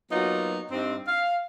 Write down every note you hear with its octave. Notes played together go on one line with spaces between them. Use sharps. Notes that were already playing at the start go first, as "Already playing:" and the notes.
F#3 A#3 B3 D#4 F4 F#4
G2 C4 D#4
F5